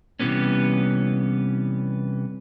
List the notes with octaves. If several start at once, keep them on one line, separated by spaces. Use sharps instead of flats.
C3 E3 F3 G3 B3 C#4